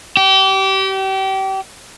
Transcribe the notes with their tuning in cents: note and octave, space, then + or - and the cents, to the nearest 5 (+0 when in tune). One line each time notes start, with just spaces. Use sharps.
G4 -30